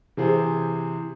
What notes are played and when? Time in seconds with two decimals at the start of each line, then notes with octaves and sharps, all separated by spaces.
0.17 C3 E3 G#4 C5